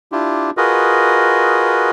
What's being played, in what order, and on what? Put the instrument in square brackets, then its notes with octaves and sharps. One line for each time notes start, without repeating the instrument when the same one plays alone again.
[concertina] D4 E4 F4 G4
F4 F#4 G#4 A#4 B4 D#5